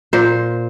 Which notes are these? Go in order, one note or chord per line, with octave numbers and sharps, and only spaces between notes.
A#2 C5